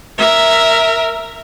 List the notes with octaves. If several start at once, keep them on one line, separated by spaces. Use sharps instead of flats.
A#4 E5